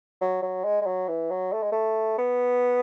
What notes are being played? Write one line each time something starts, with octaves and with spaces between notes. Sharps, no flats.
F#3
F#3
G#3
G#3
F#3
E3
F#3
A3
G#3
A3
B3